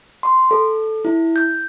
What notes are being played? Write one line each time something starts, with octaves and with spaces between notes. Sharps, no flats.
C6
A4
E4
G6